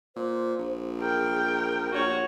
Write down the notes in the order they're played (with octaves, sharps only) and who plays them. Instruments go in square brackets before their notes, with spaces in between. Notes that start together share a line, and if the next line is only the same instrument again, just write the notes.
[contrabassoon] A#2 [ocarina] C5
[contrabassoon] A#1
[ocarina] G#4 [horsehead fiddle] A#4 G5
[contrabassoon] A#1 [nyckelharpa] F#4 C#5